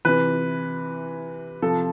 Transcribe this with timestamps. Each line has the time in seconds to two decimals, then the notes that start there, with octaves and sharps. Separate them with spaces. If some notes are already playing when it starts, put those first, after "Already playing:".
0.05 C3 E3 B4
1.62 C3 F3 A4